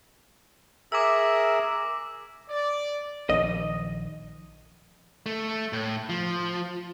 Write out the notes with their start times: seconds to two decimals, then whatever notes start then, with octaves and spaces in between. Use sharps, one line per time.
0.92 G#4 A#4 E5 D6 E6
2.50 D5
3.29 A#1 D#3 F3 D#5
5.26 A3
5.73 A2
6.09 F3